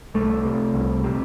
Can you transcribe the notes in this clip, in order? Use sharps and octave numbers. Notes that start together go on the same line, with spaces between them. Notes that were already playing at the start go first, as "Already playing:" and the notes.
C2 A3
C3
C2
C3